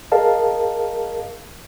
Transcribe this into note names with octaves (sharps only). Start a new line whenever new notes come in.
G#4 A#4 D#5 F5 A5